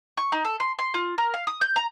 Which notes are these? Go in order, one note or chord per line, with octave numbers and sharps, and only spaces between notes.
C#6
D#4
A4
C6
C6
F4
A#4
F5
D#6
G6
A#5